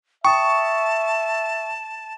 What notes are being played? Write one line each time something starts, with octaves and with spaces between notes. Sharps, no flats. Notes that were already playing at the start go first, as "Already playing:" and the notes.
E5 G5 A5 C#6 D#6